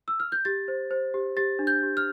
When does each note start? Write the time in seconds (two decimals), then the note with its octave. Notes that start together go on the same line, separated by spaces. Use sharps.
0.08 E6
0.20 F6
0.32 G6
0.45 G4 A6
0.68 C5
0.91 C5
1.14 G4
1.37 G4 A6
1.59 D4
1.67 G6
1.83 G4
1.97 F6